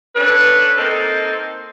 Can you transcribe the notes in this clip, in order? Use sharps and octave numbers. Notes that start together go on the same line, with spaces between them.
C#4 D4 A4 B4
A#3 C4 D#4 A4 A#4